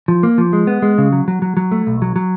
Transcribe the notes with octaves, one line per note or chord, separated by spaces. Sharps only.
F3
A#3
F3
G#3
B3
G#3
C#3
F#3
F#3
F#3
F#3
A3
B1
F#3
F#3